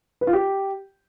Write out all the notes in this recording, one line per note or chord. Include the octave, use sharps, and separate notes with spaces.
B4
F4
G4